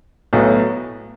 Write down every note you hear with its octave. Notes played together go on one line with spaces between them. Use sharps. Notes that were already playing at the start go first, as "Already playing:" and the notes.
B1 A2 F#3 B3